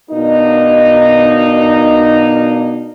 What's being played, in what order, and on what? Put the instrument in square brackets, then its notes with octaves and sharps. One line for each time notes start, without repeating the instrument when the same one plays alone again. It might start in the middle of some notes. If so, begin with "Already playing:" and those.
[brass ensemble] B2 A#3 D4 D#4